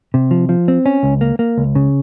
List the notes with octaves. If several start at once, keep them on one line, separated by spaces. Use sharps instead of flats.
C3
F3
F3
C4
C#4
C#2
A#3
A#3
C#2
C#3